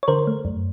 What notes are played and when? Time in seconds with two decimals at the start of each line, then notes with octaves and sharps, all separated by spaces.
0.03 C#5
0.08 D3 A#4 C5
0.27 A3
0.45 F#2